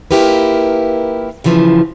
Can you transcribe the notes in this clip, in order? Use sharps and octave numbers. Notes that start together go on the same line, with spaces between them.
A#3 E4 F4 G4 A#4 B4
F#2 C#3 E3 F3